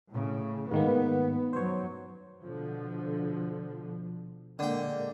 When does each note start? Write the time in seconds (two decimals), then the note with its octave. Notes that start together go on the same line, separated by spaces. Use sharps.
0.12 A2 C#3
0.71 G#2 D#3 A#3 B3
1.53 F#2 F#3 C5 C#5
2.43 B2 D3 F3
4.59 A#2 D3 G#3 A#3 G5